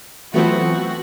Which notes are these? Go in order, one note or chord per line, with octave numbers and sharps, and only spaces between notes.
E3 F#3 A3 B3 C4 F4 F#4